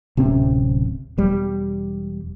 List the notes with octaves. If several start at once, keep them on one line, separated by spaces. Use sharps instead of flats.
D1 C3 C4 C#4
E1 G3